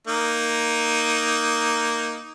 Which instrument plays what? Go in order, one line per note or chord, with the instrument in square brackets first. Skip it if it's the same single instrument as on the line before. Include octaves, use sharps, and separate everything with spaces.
[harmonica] A#3 D#4